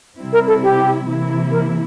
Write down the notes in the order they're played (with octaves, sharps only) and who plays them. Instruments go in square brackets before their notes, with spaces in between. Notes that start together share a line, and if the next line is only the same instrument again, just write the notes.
[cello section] C3 G3 C4 E4
[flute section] A#4
A4
G4
[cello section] C3 E3 A#3 E4
[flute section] A#4